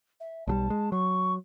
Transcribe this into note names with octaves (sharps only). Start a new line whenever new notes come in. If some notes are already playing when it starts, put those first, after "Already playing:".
E5
B1 F#3 G3 A5
G#3
F#3 C#6